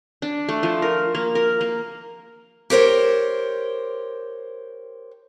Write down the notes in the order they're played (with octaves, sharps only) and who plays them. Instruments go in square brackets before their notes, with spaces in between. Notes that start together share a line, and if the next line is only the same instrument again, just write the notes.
[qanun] D4
A3
F3
A#4
A#3
A#4
A#3
[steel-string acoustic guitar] G4 A#4 C5 C#5